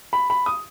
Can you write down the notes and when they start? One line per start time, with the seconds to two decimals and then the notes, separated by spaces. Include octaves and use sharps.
0.13 B5
0.30 B5
0.46 D#6